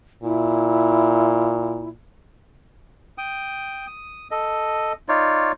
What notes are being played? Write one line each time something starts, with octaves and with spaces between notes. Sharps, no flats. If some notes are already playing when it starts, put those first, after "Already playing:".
A#2 E4
G5 D#6
D#6
A4 D#5
D#4 F4 C#5 D5